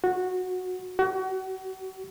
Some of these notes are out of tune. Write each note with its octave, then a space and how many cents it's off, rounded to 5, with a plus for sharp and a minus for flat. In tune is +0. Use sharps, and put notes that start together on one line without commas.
F#4 -10
F#4 +35